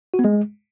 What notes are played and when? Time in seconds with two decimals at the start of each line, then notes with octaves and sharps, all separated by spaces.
0.14 F#4
0.19 B3
0.24 G#3